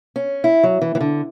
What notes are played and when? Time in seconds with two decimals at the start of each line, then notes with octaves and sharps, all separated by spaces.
0.16 C#4
0.44 E4
0.63 F#3
0.82 E3
0.95 E3
1.01 D3